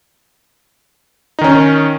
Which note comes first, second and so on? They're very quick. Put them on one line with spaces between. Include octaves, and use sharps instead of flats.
D#4 D#3 C#4